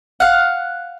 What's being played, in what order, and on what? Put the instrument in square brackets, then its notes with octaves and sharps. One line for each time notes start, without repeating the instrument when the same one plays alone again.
[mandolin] F5 F#5